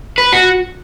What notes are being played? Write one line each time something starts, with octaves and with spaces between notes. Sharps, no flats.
B4
F#4